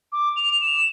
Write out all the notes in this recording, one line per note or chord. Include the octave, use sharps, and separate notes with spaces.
D6
F7
E7